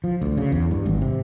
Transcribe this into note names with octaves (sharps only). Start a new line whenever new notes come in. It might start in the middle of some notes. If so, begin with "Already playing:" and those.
F3
D2
C#3
E2
G2
G#1
C3